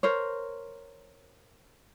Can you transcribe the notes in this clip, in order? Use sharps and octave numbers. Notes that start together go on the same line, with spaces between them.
A#4 C5 C#5